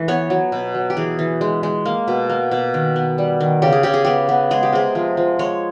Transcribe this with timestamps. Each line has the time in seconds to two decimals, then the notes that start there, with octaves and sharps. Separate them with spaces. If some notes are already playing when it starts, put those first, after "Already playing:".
Already playing: E3 A3
0.08 B3 C#5
0.30 F#3
0.52 B2
0.75 F#3
0.90 G4
0.97 E3 G#4
1.19 E3
1.41 G#3
1.63 G#3
1.86 A#3
2.08 B2
2.30 A#3
2.51 B2
2.74 D#3
2.96 B3
3.18 G3
3.40 D#3
3.62 C#3 G4
3.72 G#4
3.83 C#3 G4
3.94 G#4
4.04 B3 G4
4.29 B3
4.51 G#3 G#4
4.63 G4
4.73 C3 G#4
4.95 F3
5.17 F3
5.39 G#3 C#5